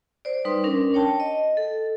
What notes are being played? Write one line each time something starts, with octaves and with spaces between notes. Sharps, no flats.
C5 D5
G3 D#4 B4 C6
C#4 D4 A#4
C#5 G5 A5
D#5
A4